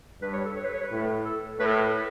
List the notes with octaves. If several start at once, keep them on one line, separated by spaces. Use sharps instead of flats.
G2 B4
C#5
A4
C#5
B4
C#5
B4
A2
A4
A2 B4
A4
B4
B4